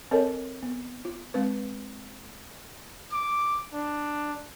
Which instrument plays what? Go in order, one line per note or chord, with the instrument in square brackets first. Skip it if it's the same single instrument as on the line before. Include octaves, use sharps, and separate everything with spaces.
[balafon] C4 A4 A#4 C#5 D#5 G#5
B3
F4
G#3 C4 B4
[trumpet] D6
D4